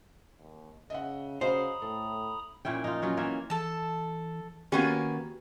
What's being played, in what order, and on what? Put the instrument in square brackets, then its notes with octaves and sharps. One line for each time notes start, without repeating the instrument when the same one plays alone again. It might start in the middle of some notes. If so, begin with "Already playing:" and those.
[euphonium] D#2
[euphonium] C#3 [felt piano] D#5 E5 F#5
[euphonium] C#3 [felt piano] F#4 D#5 F5 [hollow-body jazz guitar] C5 [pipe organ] A#5 B5 D#6
[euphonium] A2 [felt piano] A4
[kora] A#2 C#4 E4 G5
D#4 F4
F#3 C#4 F4
E3 A#3 C#4 E5
[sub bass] E3 [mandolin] A4 A5
[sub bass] D#3 [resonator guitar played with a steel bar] A#3 B3 C#4 [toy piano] F#4 G4 G5 [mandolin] G#5